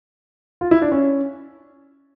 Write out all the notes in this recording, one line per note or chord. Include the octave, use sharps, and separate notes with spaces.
F4
E4
D4
C#4